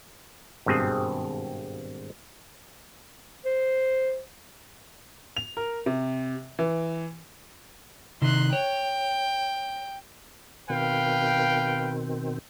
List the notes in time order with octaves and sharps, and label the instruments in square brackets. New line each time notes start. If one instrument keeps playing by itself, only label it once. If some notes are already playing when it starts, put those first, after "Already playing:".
[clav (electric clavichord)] G#1 G2 B2 C4 G#4
[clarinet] C5
[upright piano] F7
A#4
C3
E3
[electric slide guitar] C3 D#3 [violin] C6 F#6
[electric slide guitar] C#5 [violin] G5
[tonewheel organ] B2 D#3 C4 [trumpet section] B4 F5 G5